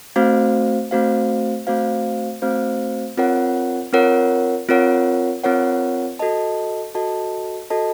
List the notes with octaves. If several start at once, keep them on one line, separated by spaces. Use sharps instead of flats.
A3 C4 F#4 C5 F5
A3 C4 F#4 C5 F5
A3 C4 F#4 C5 F5
A3 C4 F#4 C5 F5
C4 F4 A#4 C#5 F#5
C4 F4 A#4 C#5 F#5
C4 F4 A#4 C#5 F#5
C4 F4 A#4 C#5 F#5
F#4 A4 D#5 A5
F#4 A4 D#5 A5
F#4 A4 D#5 A5